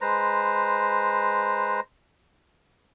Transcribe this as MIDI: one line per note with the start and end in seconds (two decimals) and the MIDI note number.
0.01 1.80 56
0.01 1.80 71
0.01 1.80 72
0.01 1.80 82